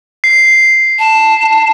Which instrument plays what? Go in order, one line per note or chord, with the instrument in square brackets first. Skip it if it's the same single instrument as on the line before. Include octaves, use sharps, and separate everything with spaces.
[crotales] C7
[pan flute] A5